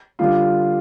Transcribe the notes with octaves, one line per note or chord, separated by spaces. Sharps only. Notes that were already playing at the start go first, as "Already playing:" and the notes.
D3 G3 D4 F4